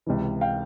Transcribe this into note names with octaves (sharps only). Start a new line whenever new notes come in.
C#2 C3 E3
F5 G5